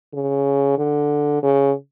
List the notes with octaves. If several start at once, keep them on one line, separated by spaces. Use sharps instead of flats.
C#3
D3
C#3